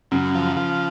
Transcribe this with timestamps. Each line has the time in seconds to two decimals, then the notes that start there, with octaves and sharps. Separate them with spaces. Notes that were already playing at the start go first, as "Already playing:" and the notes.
0.11 F#2 C#3
0.35 F3
0.57 F3